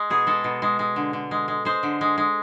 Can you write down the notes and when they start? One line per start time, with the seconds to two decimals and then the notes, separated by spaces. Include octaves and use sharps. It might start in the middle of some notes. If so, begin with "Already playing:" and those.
Already playing: G#3
0.10 B2 G#4
0.27 G#3 A4
0.44 B2
0.62 G#3
0.79 G#3
0.96 D3
1.13 D3
1.31 G#3
1.48 G#3
1.65 G#3 C5
1.83 D3
2.01 G#3
2.18 G#3